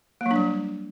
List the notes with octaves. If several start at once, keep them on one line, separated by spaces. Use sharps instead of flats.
A#3
F#3
D4
G3